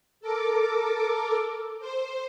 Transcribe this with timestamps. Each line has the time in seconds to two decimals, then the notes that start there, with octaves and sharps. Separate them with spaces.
0.21 A4 A#4 D6
1.80 C5